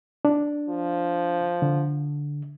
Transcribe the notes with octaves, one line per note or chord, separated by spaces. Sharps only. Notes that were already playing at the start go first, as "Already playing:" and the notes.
D4
F3
D3